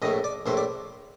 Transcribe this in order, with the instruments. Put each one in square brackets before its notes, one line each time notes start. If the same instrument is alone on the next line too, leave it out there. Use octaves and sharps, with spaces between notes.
[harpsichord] A#1 A2 A3 D#5
D5
A#1 A2 A3 C5
D5